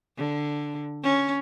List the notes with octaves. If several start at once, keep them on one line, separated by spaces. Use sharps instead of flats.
D3
C#4